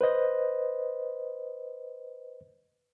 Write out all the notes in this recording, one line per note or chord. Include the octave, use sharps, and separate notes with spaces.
B4 C5 D#5